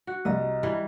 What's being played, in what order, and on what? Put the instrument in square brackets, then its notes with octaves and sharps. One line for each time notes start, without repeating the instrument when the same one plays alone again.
[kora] F#4
[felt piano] C2 [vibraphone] D#5 A#5
[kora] E3 [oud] G3